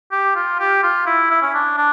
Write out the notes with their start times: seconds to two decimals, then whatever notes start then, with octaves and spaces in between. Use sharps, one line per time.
0.12 G4
0.35 F4
0.59 G4
0.83 F4
1.06 E4
1.30 E4
1.42 C#4
1.54 D4
1.77 D4